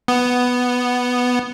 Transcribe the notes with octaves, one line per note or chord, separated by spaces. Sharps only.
B3